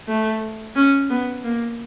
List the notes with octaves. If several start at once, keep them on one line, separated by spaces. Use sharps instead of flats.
A3
C#4
B3
A#3